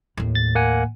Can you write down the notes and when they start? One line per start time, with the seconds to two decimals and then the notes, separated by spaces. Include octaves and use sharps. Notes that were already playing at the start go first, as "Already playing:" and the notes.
0.17 D#2 A2
0.35 A6
0.55 A#3 F#5 G#5